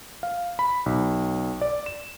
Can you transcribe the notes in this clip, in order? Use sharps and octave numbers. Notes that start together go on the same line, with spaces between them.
F5
B5
B1
D5
E7